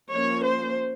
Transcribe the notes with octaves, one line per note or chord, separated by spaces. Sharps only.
F3 A#3 C#4 C#5
C5